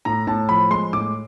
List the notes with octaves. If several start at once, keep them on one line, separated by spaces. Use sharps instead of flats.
A2 A#5
A2 A5
F3 B5
G#3 C6
A2 D6